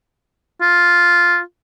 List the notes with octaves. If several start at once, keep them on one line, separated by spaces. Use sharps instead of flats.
F4